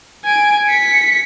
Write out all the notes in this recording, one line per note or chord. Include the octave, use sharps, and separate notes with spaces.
G#5 D7
B6 C#7